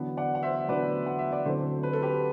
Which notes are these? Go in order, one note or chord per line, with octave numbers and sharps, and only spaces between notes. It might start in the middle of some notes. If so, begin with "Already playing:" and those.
Already playing: E2 D3 F#3 B3 D4
D5 F#5
F#5
C5 E5
E2 D3 F#3 B3 D4 B4 D5
F#5
E5
D5
D2 D3 F#3 C4 E4 A4 C5
B4
A4
G4 B4